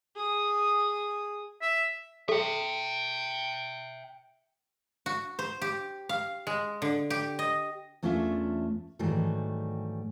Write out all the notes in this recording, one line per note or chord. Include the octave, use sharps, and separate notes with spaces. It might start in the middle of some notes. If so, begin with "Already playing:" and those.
G#4 D#6
E5
A4 E5 G5
F#4
C5
G4
F5
G#3
D3
G4
D#5
E2 A3 C#4 D4 F4 E5
G#2 D#3 E3 F#3 G3 A3